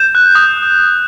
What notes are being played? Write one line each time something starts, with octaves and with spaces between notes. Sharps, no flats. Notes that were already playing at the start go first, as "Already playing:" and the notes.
Already playing: G6 E7
F#6
D#6